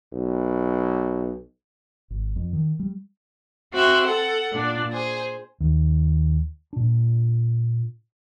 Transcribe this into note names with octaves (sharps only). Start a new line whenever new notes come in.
B1
G#1
F2
D#3
G3
C4 F#4 E5 C6
A4 F#5
A#2 D4
G#4 C5
D#2
A#2 D4